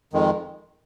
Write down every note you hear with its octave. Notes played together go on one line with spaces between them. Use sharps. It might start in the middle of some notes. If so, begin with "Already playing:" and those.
F2 D#3 G#3